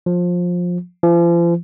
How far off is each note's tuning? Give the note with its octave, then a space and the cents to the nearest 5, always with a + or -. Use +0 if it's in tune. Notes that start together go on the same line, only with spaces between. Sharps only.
F3 +20
F3 -40